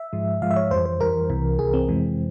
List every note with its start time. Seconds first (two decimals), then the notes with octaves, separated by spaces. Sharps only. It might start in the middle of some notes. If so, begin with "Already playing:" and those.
Already playing: E5
0.13 G#2 F3 G#3
0.42 G#2 F3 G#3 F5
0.51 E5
0.56 C#5
0.71 F2 E3 G3 C5
0.86 C5
1.01 F2 E3 G3 A#4
1.30 C2 C3 E3
1.59 C2 C3 E3 G#4
1.74 C4
1.89 F2 C3 E3 G#3